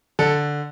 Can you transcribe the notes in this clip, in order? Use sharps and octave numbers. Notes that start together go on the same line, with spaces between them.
D3 A4